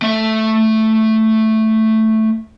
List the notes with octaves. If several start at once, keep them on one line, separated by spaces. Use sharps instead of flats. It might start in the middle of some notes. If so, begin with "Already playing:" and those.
A3 E5